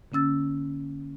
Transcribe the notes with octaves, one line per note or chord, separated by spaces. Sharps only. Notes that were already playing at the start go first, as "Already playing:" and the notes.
D3 A#3 C#4 E6 A6